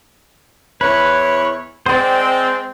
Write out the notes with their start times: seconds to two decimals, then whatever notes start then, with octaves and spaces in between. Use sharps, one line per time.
0.81 E2 E3 B4 C#5
1.86 G#3 C4 C5 D5